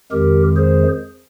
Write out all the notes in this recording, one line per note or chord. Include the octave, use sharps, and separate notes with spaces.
F2 D#3 G#3 G4 A#4
G#4 C5